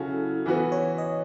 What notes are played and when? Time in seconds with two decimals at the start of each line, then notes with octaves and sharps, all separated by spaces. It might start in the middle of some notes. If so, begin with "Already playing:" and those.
Already playing: C#3 F#3 C#4 E4 F#4 A4
0.46 E3 B3 F#4 B4
0.72 C#5
0.98 D#5